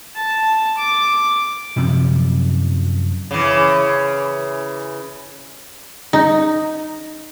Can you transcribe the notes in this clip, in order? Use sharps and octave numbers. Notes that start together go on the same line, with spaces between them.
A5
D6
F#2 C3 F3 F#3
C#3 E3
D#4